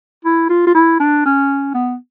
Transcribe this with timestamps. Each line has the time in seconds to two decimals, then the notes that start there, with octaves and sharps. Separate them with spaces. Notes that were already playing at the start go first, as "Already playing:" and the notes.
0.25 E4
0.50 F4
0.67 F4
0.75 E4
1.00 D4
1.25 C#4
1.74 B3